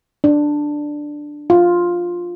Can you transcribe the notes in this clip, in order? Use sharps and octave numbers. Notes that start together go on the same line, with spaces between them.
D4
F4